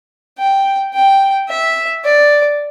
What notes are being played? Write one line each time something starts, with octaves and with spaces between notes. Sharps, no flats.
G5
G5
E5
D5